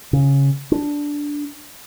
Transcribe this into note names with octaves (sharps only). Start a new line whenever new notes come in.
C#3
D4